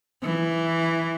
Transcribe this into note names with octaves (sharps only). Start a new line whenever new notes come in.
E3